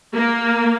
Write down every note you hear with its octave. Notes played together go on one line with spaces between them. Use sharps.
A#3